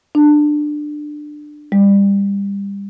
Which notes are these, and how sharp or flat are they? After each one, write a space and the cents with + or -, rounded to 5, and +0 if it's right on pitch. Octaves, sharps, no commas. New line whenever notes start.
D4 +20
G3 +25